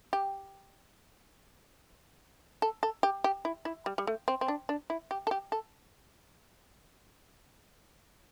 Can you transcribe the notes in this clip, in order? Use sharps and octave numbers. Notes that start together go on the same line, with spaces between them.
G4
A4
A4
G4
G4
E4
E4
G3
G3
A3
C4
C4
D4
D4
E4
G4
A4
G4
A4